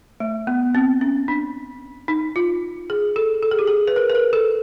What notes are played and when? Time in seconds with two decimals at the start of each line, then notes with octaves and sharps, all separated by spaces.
0.20 A3
0.47 B3
0.75 C4
1.01 C#4
1.28 D4
2.08 D#4
2.36 F4
2.90 G#4
3.16 A4
3.43 A4
3.51 G#4
3.59 G4
3.67 G#4
3.88 B4
3.96 A#4
4.10 B4
4.15 A#4
4.33 A4